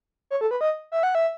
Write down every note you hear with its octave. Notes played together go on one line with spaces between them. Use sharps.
C#5
A4
B4
D#5
E5
F#5
E5